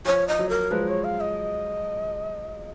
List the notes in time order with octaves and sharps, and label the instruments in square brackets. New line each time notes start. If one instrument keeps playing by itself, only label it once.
[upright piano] F3 [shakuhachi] C#5
[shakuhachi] D#5
[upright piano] F#3
[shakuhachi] A#4
[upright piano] F3 G#3 [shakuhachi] B4
[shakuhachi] C#5
F5
D#5